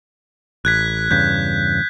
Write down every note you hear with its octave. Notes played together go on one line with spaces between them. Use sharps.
A1 F#6 G#6 B6
E2 G2 C#3 G6 B6